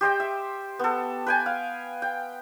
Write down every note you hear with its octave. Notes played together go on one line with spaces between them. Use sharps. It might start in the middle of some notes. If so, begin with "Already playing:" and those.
G4 C5 D#5 G5
E5
B3 A4
B4 G5 G#5
F5
G5